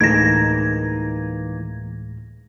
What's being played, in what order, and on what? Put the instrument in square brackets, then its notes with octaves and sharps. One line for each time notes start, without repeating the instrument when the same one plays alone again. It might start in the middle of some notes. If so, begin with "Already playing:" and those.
[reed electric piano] D2 A2 G#3 [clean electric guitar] E3 A#3 D#4 [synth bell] G#6 A#6